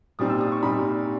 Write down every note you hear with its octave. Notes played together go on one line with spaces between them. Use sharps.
A#2 G3 C4 D#4 D#6
E6
D#6
C#6
A#2 G3 C4 D#4 B5